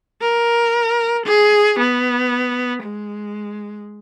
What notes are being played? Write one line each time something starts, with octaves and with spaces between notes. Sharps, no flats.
A#4
G#4
B3
G#3